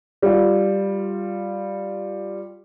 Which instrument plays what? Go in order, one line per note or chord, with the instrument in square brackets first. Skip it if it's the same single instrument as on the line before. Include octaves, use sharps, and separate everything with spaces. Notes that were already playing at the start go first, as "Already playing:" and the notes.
[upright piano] G3 F4